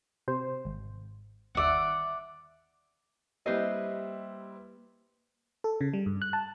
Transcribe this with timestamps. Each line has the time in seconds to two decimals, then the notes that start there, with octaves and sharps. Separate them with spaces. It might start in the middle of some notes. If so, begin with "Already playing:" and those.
0.28 C3 C5
0.65 G#1
1.55 G1 D#2 D5 E5 F#5
3.46 G3 A#3 C4 E4 G4 B4 C5 D#5
5.64 A4
5.81 C#3
5.93 G3
6.06 G2
6.22 F#6
6.33 A5